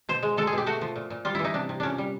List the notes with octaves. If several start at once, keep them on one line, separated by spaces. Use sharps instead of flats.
B2 C5
G#3
G#3 A4
G#4
B2 G4
A3 F#4
F3
A#2
A#2
G3 F4
E3 E4
D#4
C3 D4
C3
A#2 C#4 D4
G3